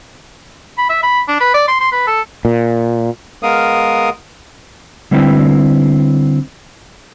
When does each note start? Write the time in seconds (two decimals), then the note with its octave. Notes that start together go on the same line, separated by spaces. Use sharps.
0.78 B5
0.89 E5
1.03 B5
1.28 D4
1.40 B4
1.54 D5
1.68 C6
1.80 C6
1.92 B4
2.07 A4
2.45 A#2
3.43 G#3 B3 A#4 F5 D#6
5.11 D3 G3 C4 E4 B4